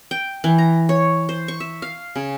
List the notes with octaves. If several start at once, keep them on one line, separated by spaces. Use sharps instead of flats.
G5
E3
A#5
C#5
C5
C#6
E5
F5
C#3